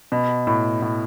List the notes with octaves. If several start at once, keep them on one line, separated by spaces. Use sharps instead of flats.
B2
A2
A2